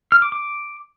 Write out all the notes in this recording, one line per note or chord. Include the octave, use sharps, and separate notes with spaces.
F6
D6
D6